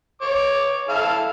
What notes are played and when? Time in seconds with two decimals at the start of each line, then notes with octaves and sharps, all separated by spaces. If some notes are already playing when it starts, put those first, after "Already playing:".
0.21 C#5 D6
0.89 E4 A4 F5